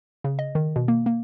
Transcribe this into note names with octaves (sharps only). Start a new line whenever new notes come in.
C#3
D#5
D#3
B2
A#3
A#3